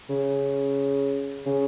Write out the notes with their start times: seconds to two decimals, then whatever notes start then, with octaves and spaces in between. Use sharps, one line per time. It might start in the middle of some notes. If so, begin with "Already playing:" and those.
0.10 C#3
1.46 C#3